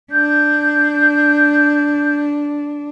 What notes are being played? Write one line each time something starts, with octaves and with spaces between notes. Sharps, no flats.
D4 G6